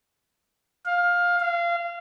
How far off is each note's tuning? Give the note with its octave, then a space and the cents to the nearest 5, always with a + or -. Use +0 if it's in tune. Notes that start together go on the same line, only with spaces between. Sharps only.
F5 +15
F5 -25